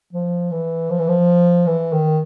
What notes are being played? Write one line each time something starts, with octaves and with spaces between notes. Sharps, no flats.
F3
E3
F3
E3
F3
E3
D#3